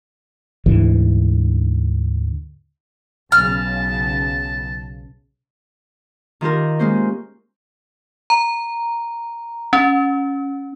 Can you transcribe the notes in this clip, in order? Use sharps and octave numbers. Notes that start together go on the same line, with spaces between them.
D2 G#2 D3 E3
B1 C#3 A5 F6
D#3 F4 G4 A#4
G#3 A#3 C#4 C5
A#5
C#4